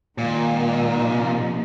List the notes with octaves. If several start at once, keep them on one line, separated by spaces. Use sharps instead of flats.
A#2 D#3 G#3 D#4
C3 F3 A#3 D#4